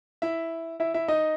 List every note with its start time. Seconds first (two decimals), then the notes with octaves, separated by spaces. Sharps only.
0.22 E4 E5
0.80 E4 E5
0.94 E4 E5
1.08 D#4 D#5